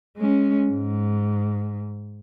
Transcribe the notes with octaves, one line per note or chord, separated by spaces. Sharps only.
G#3 C#4
G#2